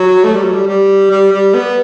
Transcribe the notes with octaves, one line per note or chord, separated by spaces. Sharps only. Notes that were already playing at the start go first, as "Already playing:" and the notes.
Already playing: F#3
A3
G3
F#3
G3
G3
G3
G3
B3